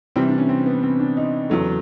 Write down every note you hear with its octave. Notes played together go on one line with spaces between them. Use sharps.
C3 E3 G3 C4
D4
C#4
C4
B3
C4
D4
D#4
E2 C#3 F#3 A3